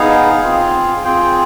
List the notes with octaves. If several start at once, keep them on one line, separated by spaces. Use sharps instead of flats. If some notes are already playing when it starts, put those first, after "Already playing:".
Already playing: B3 D#4 G#4 F5
C4 F4 G#4
C4 F4 G#4 G5